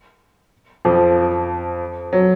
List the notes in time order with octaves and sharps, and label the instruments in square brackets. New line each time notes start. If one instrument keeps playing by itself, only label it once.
[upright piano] F2 F3
F#3